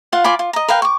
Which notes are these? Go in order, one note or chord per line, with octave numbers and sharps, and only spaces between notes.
F4 F5 F#5
F4 D5 G#5 B5
F4
D#5 A#5
A#4 B4 F5 G5
C#6 D6